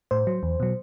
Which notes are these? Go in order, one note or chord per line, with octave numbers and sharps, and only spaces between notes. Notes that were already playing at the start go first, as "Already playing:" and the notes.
A2 C5
F#3
E2
B2 F#3